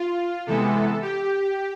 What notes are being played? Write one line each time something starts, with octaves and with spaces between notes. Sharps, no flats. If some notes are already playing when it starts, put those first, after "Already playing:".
Already playing: F4
C3 E3 G#3 B3 A4
G4